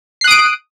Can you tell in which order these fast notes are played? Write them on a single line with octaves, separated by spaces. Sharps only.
C7 F#6 D#6 D7